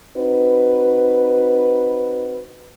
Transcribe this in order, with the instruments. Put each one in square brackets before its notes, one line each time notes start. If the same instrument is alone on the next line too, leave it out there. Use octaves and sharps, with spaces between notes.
[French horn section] C4 D#4 F#4 B4